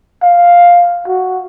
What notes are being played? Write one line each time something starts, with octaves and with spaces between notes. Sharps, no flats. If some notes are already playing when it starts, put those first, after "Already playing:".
F5
F#4